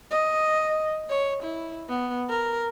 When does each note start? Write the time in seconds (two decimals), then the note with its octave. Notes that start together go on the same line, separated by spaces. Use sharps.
0.11 D#5
1.10 C#5
1.43 E4
1.89 B3
2.30 A#4